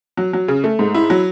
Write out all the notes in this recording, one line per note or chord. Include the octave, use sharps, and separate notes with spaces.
F#3
F#3
C#3
A3
G#2
E4
F#3